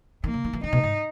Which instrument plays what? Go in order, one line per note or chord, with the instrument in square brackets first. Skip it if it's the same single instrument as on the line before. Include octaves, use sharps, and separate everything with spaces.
[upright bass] D#3 [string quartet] A#3
[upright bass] C#3
D#3
E3
[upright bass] D#3 [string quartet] D#4
[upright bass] B2
G#2